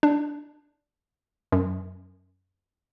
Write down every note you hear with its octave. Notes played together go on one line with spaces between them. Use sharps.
D4
F#2